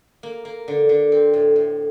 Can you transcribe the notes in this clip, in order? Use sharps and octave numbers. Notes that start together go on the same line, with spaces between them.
A#3
A#3
D3
D3
C4
A2
A2